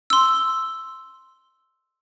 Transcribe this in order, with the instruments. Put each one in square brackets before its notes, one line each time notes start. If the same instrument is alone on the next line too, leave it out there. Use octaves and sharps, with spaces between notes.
[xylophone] C6 E6